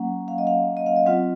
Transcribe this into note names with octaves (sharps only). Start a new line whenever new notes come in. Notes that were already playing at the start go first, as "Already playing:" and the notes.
Already playing: F#3 A#3 C#4 F#5
F5
D#5
F5
D#5
F5
D#5
F#3 C4 F4 F#5